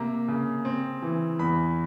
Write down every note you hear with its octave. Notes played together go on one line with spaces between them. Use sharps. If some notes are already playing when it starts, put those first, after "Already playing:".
Already playing: C3 A#3 A#5
C#3
C4
E3
E2 B5